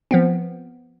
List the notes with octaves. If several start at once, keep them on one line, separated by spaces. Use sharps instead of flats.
F3 B3 C4